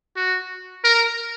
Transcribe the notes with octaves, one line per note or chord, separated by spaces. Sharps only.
F#4
A#4